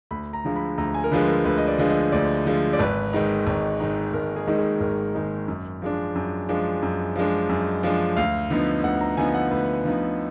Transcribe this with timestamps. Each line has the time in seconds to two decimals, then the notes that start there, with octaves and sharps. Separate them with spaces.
0.11 D2 B5
0.33 A#5
0.45 D3 F3 G#3
0.56 B5
0.78 D2 A#5
0.94 G#5
1.04 A#4
1.12 D3 F3 G#3 B4
1.28 A#4
1.45 D2 B4
1.58 D#5
1.68 D5
1.79 D3 F3 G#3
1.90 D#5
2.12 D2 D5
2.46 D3 F3 G#3
2.73 D5
2.79 G#1 B4
3.13 G#2 D#3 G#3 D#4
3.47 G#1
3.80 G#2 D#3 G#3 D#4
4.14 G#1 A#4
4.36 G#4
4.47 G#2 D#3 G#3 D#4
4.59 G#4
4.81 G#1 A#4
5.15 G#2 D#3 G#3 D#4
5.48 F#2
5.82 F3 G#3 D4
6.15 F#2
6.49 F3 G#3 D4
6.83 F#2
7.16 F3 G#3 D4
7.49 F#2
7.83 F3 G#3 D4
8.17 D2 F5
8.50 D3 F3 B3 D#4
8.84 D2 F#5
9.01 A#5
9.17 D3 F3 B3 D#4 G#5
9.34 F#5
9.51 D2 B4
9.84 D3 F3 B3 D#4